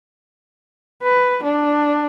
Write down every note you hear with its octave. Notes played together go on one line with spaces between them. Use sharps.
B4
D4